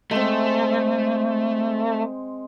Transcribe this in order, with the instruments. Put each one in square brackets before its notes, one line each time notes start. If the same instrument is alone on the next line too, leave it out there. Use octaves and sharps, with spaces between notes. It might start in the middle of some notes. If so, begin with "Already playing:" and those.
[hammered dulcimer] G#3 C4 [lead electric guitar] A3